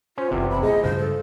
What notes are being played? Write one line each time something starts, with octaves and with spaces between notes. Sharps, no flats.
C#4 F4 C5
F#1 E2 C3 C4 D#4
B5
A3 G#4 D#5
G2 C#3 F3 G#3 C5
A4